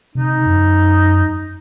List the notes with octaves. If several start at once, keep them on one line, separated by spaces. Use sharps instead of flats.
C3 D#4
F#2